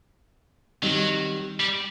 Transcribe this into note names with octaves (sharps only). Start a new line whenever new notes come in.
D#3 F#3 G3 C4 D#4
G3